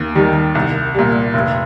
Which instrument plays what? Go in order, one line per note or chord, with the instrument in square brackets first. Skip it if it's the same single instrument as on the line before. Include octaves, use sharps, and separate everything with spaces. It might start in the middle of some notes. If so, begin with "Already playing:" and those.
Already playing: [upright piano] D#2
D#3 G3
C2
A#2 G3
F1